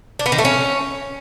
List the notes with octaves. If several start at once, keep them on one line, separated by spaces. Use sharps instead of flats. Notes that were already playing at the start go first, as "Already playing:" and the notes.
D4
B3
D#3
A3
C#4